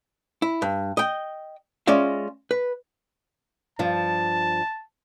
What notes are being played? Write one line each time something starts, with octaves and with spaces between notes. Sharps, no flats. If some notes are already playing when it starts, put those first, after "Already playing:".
E4
G2
D#5 G5
G#3 C#4 F4 D5 E5
B4
G2 F3 A5